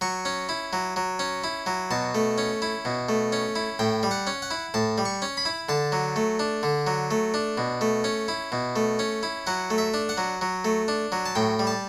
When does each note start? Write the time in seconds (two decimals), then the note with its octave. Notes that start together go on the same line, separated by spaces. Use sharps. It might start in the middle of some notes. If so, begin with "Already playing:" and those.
0.01 F#3 C#6
0.25 C#4
0.49 E4
0.73 F#3
0.96 F#3
1.19 C#4
1.44 E4
1.66 F#3
1.91 B2 A5
2.15 A3
2.38 C#4
2.62 E4
2.85 B2
3.09 A3
3.32 C#4
3.56 E4
3.79 A2 G5
4.03 G3
4.11 F#5
4.27 C#4
4.42 F#5
4.51 E4
4.74 A2 A5
4.98 G3
5.05 C#6
5.22 C#4
5.37 B5
5.45 E4
5.69 D3 A5
5.92 F#3
6.16 A3
6.39 D4
6.63 D3
6.87 F#3
7.11 A3
7.34 D4
7.58 B2
7.81 A3
8.04 C#4
8.28 E4
8.52 B2
8.76 A3
8.99 C#4
9.23 E4
9.47 F#3 F#5
9.70 A3
9.78 E5
9.94 D4
10.09 F#5
10.18 F#3
10.41 F#3
10.65 A3
10.88 D4
11.12 F#3
11.26 A5
11.35 A2 G5
11.59 G3
11.67 A5